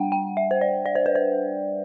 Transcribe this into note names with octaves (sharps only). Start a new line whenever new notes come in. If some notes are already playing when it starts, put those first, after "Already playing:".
Already playing: G3 D4 F#5 G5
G5
E5
C5
D5
D5
C5
B4
C5